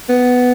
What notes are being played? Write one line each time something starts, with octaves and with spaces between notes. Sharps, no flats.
B3